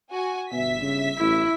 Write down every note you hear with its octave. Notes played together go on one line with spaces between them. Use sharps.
F#4 G#5
G1 B2 E5 B6
C#3
A1 E4